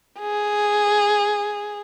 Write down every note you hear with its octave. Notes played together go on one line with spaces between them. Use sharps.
G#4